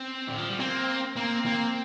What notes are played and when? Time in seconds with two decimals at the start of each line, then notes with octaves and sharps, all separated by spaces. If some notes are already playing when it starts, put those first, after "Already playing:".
Already playing: C4
0.28 D3
0.38 F3
0.49 G3
0.59 A#3 C4
1.16 A#3 C4
1.46 A#3